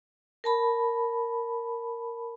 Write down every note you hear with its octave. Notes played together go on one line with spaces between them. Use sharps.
A#4 A5 B5